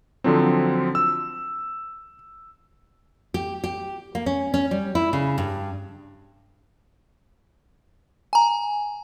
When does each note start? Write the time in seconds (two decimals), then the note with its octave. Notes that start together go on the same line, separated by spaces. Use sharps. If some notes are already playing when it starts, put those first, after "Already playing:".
0.24 D3 F3 F#3 C4
0.95 E6
3.34 G4
3.64 G4
4.15 A#3
4.26 C#4
4.54 C#4
4.71 G3
4.95 E4
5.13 C#3
5.38 G2
8.33 G#5 A#5